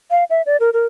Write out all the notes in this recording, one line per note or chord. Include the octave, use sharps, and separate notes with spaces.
F5
E5
D5
A#4
A#4